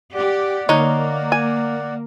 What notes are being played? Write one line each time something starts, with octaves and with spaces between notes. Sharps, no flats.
G4 D5 F#5
D3 A#3 D#4 C#5 F#6
G#5